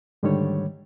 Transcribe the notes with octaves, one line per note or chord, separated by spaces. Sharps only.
G#2 D3 D#3 G3 A3 C#5